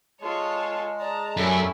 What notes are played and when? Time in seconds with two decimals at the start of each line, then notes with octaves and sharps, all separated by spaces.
0.21 G#3 F4 A4 C#5
1.00 D5 A5 A#5
1.37 F#2 G3 A3 C#4 E4 A4